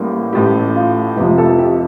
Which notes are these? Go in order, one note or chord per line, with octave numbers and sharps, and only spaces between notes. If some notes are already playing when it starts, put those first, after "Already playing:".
Already playing: A1 A2 G3 A#3
A1 A2 A3 G4
F4
F1 F2 C3 F3 G4
A4
G4